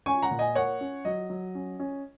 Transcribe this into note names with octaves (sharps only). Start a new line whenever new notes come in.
C#4 G#5 C#6
F#5 A#5
A#2
D#5 G#5
A#3 C#5 F#5
C#4
F#3 D#5
F#3
C#4
C#4